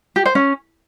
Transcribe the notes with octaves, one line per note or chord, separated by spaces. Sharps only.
G4
C5
C#4